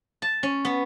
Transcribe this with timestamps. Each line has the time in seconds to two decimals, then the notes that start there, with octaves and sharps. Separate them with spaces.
0.22 A5
0.43 C#4
0.65 B3